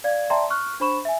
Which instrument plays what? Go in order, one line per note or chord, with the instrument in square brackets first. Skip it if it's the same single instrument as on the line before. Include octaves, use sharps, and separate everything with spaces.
[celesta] D5 F5 G#6
D5 E5 G5 A5 A#5 C6
C#6 F6 F#6
D4 C5 B5 C#6 E7
E5 G#5